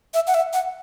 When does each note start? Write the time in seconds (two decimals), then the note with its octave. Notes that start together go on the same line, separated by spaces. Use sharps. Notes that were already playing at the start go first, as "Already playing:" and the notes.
0.14 E5
0.27 F#5
0.34 E5
0.53 F#5